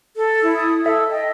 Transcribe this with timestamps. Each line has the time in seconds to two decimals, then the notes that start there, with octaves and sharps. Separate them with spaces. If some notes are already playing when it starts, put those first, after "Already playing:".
0.17 A4
0.43 E4
0.55 D#6
0.86 A4 E5 E6
1.11 D#5 G5